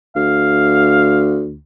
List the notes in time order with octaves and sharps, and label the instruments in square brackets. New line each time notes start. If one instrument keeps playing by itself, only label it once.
[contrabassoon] D2 [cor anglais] F5